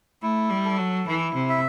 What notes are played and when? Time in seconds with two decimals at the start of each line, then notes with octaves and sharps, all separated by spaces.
0.22 A3 E4
0.50 G3
0.65 A4
0.78 F#3
1.06 E3 E4
1.34 C3
1.49 E5